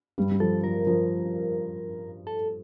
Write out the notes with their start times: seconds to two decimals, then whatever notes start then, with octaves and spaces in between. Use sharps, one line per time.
0.18 G2 G3
0.31 G3
0.40 F3 A4
0.64 F3 A#4
0.87 F3
2.27 A4